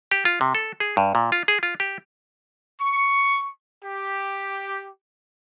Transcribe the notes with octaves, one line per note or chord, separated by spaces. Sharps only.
G4
F4
C3
A4
G#4
G2
A#2
F4
G#4
F4
G4
C#6
G4